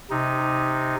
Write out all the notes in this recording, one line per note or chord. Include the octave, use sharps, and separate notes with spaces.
C3 D#4